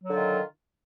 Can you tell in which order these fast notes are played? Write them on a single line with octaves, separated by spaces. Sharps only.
F#3 D3 F4 D#3